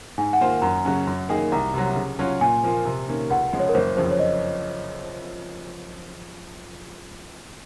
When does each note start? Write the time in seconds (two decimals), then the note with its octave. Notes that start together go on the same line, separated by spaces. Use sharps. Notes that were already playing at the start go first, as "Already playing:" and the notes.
0.18 G#2 G#5
0.33 F#5
0.40 D#3 A#3 F4 C5
0.62 F#2 A#5
0.85 C#3 F#3 C#4
1.07 F#2
1.29 D#3 A#3 D#4 G#4
1.52 C2 A#5
1.74 C3 F#3
1.96 C#3
2.19 F#3 C#4 F4
2.41 A#2 G#5
2.64 F3 A#3 F4
2.85 C3
3.08 D#3 A#3 C#4
3.30 C#2 F#5
3.53 C#3 F3 G#3
3.60 C#5
3.69 A#4
3.74 F#1 C5
3.97 F2 C#3 F3 C5
4.11 C#5
4.19 D#5